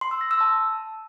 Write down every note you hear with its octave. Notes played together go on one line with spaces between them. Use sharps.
C6
E6
A#6
E6
A5